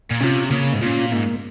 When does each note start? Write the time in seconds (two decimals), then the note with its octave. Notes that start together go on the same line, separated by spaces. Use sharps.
0.11 A#2
0.21 C3 C#4 F4
0.50 C#3 A#3
0.73 G#2
0.81 A#2 C#4 F4
1.11 G#2 A#3